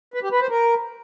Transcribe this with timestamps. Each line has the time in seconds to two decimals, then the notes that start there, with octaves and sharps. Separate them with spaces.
0.14 B4
0.23 G4
0.32 B4
0.41 C5
0.50 A#4